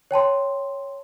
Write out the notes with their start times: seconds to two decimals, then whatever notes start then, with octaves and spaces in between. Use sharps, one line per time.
0.11 C#5 G5 A5 C6